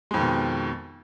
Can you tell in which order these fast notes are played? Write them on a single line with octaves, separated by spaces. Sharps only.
G#3 F2 D#3 B2